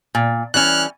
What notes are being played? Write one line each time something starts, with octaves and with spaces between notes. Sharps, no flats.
A#2
E3 G3 C#4 F6 F#6